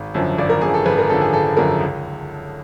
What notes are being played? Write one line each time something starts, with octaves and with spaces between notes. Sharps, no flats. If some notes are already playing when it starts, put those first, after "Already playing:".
Already playing: G#1
F#2 D3 F3
G#1 D5
A#4
F#2 D3 F3 G#4
A4
G#1 B4
A#4
F#2 D3 F3 A4
G#4
G#1 A4
F#2 D3 F3 A#4
C#2